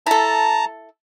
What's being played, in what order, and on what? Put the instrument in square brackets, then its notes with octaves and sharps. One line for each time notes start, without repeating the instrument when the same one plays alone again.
[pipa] E4 A4 [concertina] A5 A#5